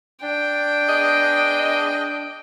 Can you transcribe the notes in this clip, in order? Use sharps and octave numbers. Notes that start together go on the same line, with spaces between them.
D4 G5
B3 G#4 D#5